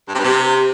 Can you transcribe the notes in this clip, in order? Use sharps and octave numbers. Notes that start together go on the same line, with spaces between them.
G2
C3
G2
C3